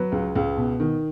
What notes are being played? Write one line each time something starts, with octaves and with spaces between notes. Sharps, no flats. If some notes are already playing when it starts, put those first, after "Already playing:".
Already playing: F#3 B4
C#2
C#2
B2
D#3